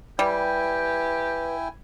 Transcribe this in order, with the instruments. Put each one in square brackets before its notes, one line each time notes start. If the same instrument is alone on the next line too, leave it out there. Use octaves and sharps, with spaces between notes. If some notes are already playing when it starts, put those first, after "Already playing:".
[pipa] G3 [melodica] E4 G5 G#5 [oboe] G4 [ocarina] B4